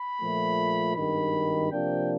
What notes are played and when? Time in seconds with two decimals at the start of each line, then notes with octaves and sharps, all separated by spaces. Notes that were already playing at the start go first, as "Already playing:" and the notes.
Already playing: B5
0.21 A#2 F3 A3
0.96 G#1 G2 D#3 B5
1.72 C3 F3 A#3 D4 G5